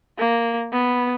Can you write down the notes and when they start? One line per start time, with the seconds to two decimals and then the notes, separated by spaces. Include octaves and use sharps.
0.18 A#3
0.72 B3